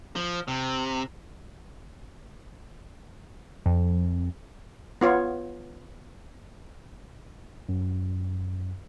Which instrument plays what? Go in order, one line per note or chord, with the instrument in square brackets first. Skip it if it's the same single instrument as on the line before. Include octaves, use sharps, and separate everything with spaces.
[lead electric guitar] F3
C3
[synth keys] F2
[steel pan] B3 F4 C#5
[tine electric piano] F#2